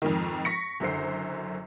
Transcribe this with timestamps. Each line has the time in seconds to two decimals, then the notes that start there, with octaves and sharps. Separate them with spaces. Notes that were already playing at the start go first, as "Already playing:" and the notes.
0.02 F2 G#2 D#3
0.45 C#6 A#6 B6 C#7
0.80 F#1 F#2 D3 C5 C7